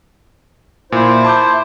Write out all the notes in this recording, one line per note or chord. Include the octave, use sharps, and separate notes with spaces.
A#2 E4 C5
A5 D6 G6